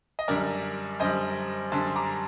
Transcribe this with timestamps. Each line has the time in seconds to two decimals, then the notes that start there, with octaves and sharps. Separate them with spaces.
0.19 D#5
0.28 F#2 D3 G3 A#4 D5
1.00 F#2 D3 G3 C5 D#5
1.72 F#2 D3 G3 A5 C6
1.87 C6
1.96 A#5 D6